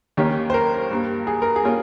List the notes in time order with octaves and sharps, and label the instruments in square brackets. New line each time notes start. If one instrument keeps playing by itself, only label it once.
[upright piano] D#2 D#3 A#3 C#4 [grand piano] G4
[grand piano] C5
A#4
[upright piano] G2 G3 A#3
[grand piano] G#4
A#4
G#4
[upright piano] G3 A#3 C#4 F4 A#4